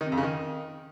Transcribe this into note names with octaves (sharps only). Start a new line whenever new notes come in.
D#3
C3
F2
C#3
D#3